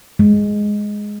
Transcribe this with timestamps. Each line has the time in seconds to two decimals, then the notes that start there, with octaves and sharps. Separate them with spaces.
0.19 G#3